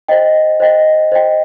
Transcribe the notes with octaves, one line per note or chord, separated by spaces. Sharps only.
C5 D#5 G5
C5 D#5 G5
C5 D#5 G5